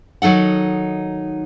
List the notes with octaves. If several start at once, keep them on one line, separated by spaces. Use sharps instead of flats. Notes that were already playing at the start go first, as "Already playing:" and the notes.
D#3 F#3 D#4 A4 F#5